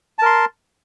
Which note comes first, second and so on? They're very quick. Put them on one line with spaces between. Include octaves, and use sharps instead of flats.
A5 A#4 C6